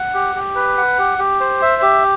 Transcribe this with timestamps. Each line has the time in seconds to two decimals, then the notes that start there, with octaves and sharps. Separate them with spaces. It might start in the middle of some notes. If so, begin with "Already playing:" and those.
Already playing: F#5
0.14 G4
0.36 G4
0.55 B4
0.77 F#5
0.99 G4
1.19 G4
1.40 C5
1.62 E5
1.82 G4